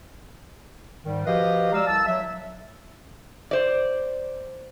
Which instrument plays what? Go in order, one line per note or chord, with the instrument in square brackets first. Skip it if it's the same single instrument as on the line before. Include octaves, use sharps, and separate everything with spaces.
[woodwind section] G#2 D#3 G3
F3 F#4 G4 B4 D#5 F5
G#3 D5 F5 A#5 E6
C2 A5 E6
F#3 E5
[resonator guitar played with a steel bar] C5 D5